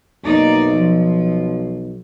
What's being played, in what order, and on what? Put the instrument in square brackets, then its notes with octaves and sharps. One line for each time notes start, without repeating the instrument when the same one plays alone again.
[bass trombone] B1 [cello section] A#3 D#4 D5
[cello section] F3